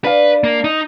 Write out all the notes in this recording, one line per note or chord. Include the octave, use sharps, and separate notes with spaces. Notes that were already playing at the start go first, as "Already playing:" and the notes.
D4 B4 F5
A#3
D#4